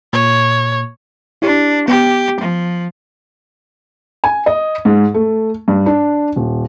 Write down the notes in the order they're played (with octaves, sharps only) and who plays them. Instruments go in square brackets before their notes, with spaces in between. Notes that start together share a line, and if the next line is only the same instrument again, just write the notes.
[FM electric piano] A#2 [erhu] C#5
[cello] D4 [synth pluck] E4 G4
[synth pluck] B3 G5 [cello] G4
[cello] F3
[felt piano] G#5
D#5
G#2
A3
G2
D4
D#1